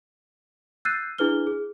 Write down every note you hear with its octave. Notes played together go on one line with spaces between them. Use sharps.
E6 F#6 G6 A6 C7 D#7
D4 E4 G#4 B4 F6 G7
G#4